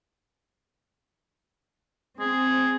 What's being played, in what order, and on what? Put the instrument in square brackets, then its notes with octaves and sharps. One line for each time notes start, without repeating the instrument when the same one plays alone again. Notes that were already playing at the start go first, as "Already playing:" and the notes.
[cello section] C4 [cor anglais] G#4